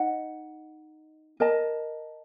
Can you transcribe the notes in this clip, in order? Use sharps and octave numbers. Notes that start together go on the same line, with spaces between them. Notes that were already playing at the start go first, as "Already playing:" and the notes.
Already playing: D#4 D#5 F#5
A#4 D#5 A5